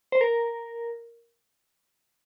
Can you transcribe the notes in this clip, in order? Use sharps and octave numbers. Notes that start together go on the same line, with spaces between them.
C5
A#4